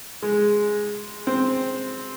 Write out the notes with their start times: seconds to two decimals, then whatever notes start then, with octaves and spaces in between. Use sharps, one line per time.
0.23 G#3
1.27 C4